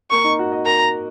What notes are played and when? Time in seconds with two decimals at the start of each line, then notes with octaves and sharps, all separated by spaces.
0.10 A#3 C#6
0.24 D#4
0.39 F#4
0.52 D#5
0.65 A#4 A#5